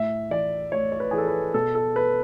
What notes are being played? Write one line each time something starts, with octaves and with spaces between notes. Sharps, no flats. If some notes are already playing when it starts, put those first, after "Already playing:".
Already playing: A2 E5
E3 D5
A2 C#5
C#5
B4
E3 G#4
A4
B4
B2 A4
A4
B4